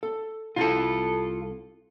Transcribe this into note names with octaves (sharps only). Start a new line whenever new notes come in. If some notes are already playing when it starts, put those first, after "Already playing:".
A4
C2 E4 F4 A4 A#5